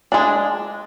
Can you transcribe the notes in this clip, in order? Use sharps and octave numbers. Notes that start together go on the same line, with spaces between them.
G#3 D4